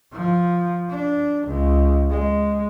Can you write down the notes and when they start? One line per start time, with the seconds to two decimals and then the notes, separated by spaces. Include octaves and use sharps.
0.13 F3
0.91 D4
1.47 C#2
2.11 G#3